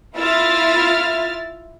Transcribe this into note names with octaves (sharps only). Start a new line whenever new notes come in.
E4 F4 E5 F6 A6